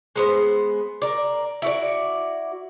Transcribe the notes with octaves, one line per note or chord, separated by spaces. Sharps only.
G#3 B3 C5
A#4 D5
E4 F#4 D5